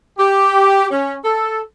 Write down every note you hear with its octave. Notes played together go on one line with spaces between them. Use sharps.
G4
C#4
A4